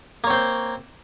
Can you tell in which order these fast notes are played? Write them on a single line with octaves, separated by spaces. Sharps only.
A#3 C#5 C4 C5